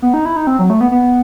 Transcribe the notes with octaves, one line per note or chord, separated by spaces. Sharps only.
B3
D#4
E4
D#4
C4
F#3
A3
B3
B3